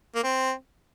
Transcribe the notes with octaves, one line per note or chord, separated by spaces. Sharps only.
A#3
C4